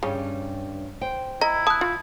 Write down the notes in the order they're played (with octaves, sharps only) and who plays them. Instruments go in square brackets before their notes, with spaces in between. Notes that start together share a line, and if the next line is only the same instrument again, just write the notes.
[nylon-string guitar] G2 C#4 G4 [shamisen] C#3
[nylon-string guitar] C5 G5
[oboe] E4 [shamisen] D#5 [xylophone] A#5
[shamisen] A5 [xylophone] D#6 F#6
[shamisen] F4